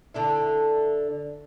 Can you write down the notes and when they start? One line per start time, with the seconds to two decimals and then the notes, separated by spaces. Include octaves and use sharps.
0.14 D3 D4 E4